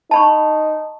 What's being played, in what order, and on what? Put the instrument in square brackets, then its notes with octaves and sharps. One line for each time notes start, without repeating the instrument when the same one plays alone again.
[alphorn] D#4 [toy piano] A5 B5 C#6